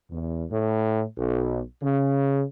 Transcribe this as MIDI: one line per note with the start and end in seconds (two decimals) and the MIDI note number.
0.11 0.44 40
0.51 1.03 45
1.18 1.61 35
1.83 2.43 49